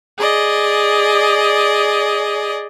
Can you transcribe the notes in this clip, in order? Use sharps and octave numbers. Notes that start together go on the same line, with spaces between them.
G#4 D5 D#5